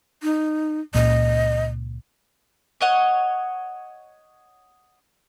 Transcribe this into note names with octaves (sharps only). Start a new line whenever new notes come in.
D#4
C#2 A#2 C#3 D#5
C#5 D#5 F#5